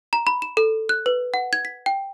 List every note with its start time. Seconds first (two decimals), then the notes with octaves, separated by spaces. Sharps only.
0.13 A#5
0.27 B5
0.42 E7
0.57 A4
0.89 F#6
1.06 B4
1.34 F#5
1.53 G#6
1.65 B6
1.86 G5